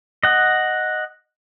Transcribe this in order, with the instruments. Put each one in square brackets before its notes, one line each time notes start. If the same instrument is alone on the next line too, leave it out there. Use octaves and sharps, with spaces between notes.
[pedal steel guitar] D#5 F#5